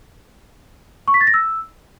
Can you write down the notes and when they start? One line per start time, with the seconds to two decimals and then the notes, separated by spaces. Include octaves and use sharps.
1.08 C#6
1.14 B6
1.21 A6
1.27 A#6
1.34 E6